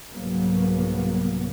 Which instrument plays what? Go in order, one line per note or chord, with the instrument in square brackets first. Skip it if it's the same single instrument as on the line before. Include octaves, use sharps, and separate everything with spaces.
[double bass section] C2 G#2 C#3 F#3 A#3 B3